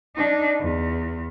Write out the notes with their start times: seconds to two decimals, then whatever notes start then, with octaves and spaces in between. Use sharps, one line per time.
0.16 D4 D#4
0.60 E2